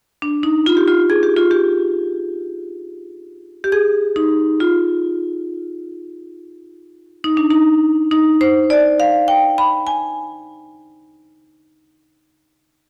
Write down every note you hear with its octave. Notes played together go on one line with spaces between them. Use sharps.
D4
D#4
F4
G4
F4
G#4
G4
F4
G4
G4
G#4
D#4
F4
D#4
D4
D#4
D#4
C5
D5
F5
G5
B5
G#5